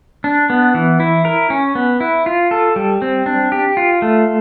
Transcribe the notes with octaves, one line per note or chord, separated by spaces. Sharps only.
D4
B3
E3
E4
A#4
C#4
B3
E4
F4
A4
G3
C4
D4
G4
F4
A3